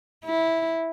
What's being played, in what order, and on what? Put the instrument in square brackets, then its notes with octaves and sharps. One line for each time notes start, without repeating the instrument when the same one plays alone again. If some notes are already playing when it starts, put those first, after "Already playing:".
[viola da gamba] E4